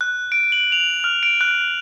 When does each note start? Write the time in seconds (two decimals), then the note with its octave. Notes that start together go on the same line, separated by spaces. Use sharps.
0.01 F#6
0.32 D7
0.52 F#7
0.72 F7
1.04 F6
1.23 D7
1.41 F#6